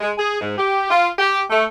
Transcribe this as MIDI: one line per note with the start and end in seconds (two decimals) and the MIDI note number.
0.01 0.11 56
0.17 0.39 68
0.40 0.56 44
0.58 0.89 67
0.90 1.08 65
1.19 1.40 67
1.50 1.63 57